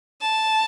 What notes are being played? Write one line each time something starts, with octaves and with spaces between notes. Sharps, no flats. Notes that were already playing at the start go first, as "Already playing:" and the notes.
A5